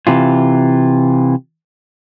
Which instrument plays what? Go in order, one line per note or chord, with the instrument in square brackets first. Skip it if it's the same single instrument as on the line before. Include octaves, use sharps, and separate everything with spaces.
[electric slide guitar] C3 E3 F4